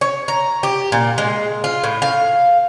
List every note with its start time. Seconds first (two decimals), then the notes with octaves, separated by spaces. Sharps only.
0.01 C#5
0.28 A#5
0.63 G4
0.92 A#2
1.18 G#3
1.64 F4
1.84 A2
2.02 F5